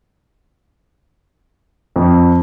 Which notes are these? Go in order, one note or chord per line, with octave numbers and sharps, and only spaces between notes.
F2